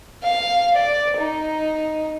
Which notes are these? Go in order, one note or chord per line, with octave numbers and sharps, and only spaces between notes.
F5
D5
D#4